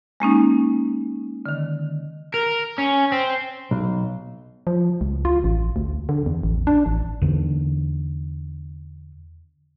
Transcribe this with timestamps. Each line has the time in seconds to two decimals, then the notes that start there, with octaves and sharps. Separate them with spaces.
0.20 G#3 A#3 C#4 D#4
1.46 D3 D#3
2.34 A#4
2.78 C#4
3.12 C4
3.71 B1
4.67 F3
5.01 C#2
5.25 F4
5.44 A1
5.76 D2
6.09 D3
6.26 E2
6.43 A1
6.67 D4
6.86 A1
7.22 E2 D3